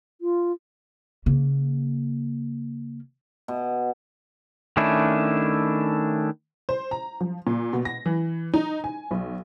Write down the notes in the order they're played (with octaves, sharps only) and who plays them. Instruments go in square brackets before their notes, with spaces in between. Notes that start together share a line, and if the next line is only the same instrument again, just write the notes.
[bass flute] F4
[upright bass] C#3 A#3
[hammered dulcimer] B2
[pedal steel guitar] D#3 A3 C#4 D4 E4
[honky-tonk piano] C5
A#5
F3
A#2
B2
A#6
E3
D#4
G#5
B1